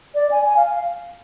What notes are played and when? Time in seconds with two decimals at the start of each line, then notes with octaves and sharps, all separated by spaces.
0.15 D5
0.31 G#5
0.45 G#5
0.56 F5